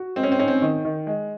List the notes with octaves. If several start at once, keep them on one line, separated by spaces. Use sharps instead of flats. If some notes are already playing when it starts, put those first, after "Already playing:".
Already playing: F#4
G#3 C4
C#4
C4
C#4 D#4
C4
D#3
D#3
G#3